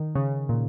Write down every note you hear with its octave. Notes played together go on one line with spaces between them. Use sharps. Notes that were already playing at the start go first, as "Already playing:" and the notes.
Already playing: D#3
C#3
A#2